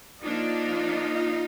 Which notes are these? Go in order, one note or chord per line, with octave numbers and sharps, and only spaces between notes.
F3 A#3 D4 D#4 F4